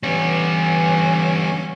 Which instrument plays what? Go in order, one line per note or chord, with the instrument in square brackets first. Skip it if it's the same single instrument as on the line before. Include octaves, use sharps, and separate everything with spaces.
[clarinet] E3 [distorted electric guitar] G3 B3 [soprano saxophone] C#4